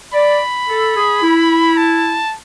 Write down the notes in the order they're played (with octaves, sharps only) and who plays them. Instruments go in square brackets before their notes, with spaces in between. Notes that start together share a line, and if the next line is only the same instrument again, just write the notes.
[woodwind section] D5 [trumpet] B5
[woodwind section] A4
G#4
E4
[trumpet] A5